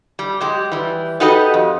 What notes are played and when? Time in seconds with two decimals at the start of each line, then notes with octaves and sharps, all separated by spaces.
0.19 G3
0.41 F#3 G#3 G4
0.72 E3 G3
1.20 D#4 F#4 G4 A4 B4 D#5
1.54 F2